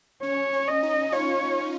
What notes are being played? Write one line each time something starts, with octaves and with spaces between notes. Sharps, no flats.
C#4 C#5
C#4
D#5
D#4
C#4 F4 C#5